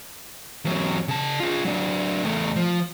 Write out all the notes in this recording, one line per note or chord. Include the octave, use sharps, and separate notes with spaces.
E2 F#3
C#3 A5
F4 G#4
F#3 D4
E2 A3
F3